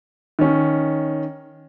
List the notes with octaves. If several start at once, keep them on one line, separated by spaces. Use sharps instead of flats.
D#3 C#4